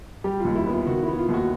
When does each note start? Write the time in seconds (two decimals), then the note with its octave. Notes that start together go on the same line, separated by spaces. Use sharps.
0.24 G3 G4
0.40 D#2 F4
0.55 E4
0.66 B3 F4
0.87 D#3 F#4
1.03 E4
1.08 B3
1.13 E4
1.18 F4
1.29 D#2
1.34 F#4